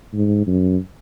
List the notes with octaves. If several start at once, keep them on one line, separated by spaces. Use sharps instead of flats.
G#2
F#2